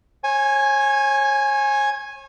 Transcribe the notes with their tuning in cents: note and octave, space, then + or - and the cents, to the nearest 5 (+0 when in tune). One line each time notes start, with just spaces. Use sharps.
C#5 -35 G#5 +0